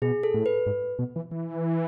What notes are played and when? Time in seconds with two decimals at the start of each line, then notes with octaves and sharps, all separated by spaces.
0.02 B2 G#4
0.23 A4
0.34 A2
0.46 B4
0.66 G#2
0.99 B2
1.16 E3
1.31 E3